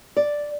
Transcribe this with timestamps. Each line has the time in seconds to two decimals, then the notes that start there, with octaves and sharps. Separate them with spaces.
0.17 D5